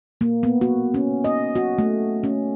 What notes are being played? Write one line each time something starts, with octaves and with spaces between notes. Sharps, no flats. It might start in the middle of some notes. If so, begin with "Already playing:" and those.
A#3
B3
F#4
C#4
D#5
F#4
A3
C#4